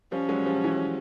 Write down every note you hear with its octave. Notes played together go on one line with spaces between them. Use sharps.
F3 G3 C#4
F#3 G#3
F3 G3
E3 F#3